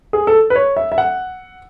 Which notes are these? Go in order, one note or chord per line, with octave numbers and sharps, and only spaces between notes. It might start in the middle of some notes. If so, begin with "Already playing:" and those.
G#4
A4
B4
C#5
E5
E5
F#5